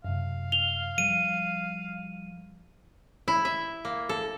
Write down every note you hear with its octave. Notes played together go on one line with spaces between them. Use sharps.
F#2 C3 F5
F7 G7
F3 G3 D#7
E4
E5
A#3
A4